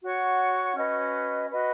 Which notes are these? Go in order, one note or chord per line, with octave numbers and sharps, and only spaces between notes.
F#4 C#5 F#5 C#6
C#4 F#4 B4 D#5
F#4 B4 D#5